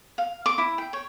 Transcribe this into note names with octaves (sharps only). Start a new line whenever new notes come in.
F5
D6
E4
G5
C#5